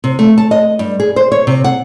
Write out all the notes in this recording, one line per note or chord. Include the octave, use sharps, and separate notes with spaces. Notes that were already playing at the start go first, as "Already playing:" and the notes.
C3
A3
A5
D#5
G2
G#4
C5
C#5
C3
F#5